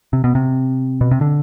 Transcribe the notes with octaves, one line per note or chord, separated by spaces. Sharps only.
C3
B2
C3
B2
C3
D3